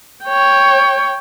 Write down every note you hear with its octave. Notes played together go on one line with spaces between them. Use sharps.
C#5 G5